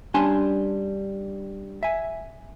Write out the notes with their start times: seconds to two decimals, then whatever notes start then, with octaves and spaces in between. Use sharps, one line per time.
0.14 G3 C#4 D4 G#5 A5 C6
1.83 E5 G#5